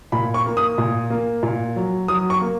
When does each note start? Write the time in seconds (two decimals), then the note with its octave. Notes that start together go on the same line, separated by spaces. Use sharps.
0.12 A#2 B5
0.34 C#6
0.46 A#3
0.57 D#6
0.78 A#2
1.10 A#3
1.43 A#2
1.76 F#3
2.08 F#3 D#6
2.30 C#6
2.41 A#3